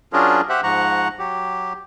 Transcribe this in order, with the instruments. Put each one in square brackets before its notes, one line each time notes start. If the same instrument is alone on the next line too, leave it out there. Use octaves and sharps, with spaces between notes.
[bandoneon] F#3 C#4 D4 F4 G#4 A#4
G4 C5 E5 F#5
G#2 F3 F#5 A#5 C#6
F#3 G4